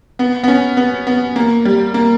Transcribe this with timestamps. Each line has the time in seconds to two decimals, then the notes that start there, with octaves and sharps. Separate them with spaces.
0.19 B3
0.44 B3
0.48 C#4
0.77 B3
1.07 B3
1.36 A#3
1.65 G3
1.94 A#3